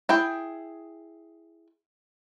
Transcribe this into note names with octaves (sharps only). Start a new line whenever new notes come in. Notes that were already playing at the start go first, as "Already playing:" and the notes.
E4 G#4 G5